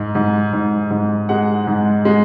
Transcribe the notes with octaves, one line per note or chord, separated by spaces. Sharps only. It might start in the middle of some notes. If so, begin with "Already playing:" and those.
Already playing: G#2
G#2
G#2
G#2
G#3 F#5
G#2
G#3